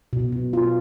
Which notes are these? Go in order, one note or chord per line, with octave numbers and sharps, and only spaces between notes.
B2
B2
F4